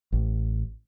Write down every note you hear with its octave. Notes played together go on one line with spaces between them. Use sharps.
A1